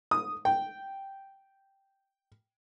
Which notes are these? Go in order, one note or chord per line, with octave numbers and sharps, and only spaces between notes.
D#6
G5